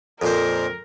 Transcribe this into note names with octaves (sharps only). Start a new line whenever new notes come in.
F2 A#2 A4 A#4 C5